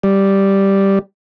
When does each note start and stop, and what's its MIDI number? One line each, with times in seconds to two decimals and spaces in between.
0.03 0.99 55